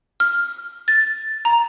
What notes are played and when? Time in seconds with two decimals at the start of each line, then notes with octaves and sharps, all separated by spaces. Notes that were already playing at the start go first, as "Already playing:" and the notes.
0.20 F6
0.88 A6
1.45 A#5